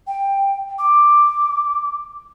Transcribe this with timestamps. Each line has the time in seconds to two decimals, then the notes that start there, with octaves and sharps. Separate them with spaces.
0.07 G5
0.79 D6